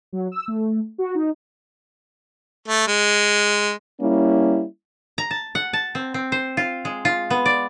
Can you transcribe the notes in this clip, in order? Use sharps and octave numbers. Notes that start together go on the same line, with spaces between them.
F#3
E6
A3
F#4
D#4
A3
G#3
G3 A#3 C#4 E4
A#5
A5
F#5
A5
C4
C4
C5
F4
G#3
F4
B3
D5